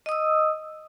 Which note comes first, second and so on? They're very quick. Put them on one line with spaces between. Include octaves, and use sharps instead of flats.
D#5 D#6 E6